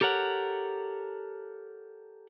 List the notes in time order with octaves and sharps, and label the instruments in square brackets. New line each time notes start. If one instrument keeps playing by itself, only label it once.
[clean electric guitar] G4 A4 A#4 C#5 F#5